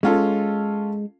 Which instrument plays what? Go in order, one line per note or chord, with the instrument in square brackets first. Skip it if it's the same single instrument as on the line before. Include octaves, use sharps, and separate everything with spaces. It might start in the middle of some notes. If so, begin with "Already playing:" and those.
[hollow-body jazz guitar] G#3 [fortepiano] C#4 F4 A4